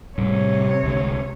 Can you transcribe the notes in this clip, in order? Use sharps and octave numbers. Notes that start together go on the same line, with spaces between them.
A2 C3 G3 C#5
C2 D3 G#3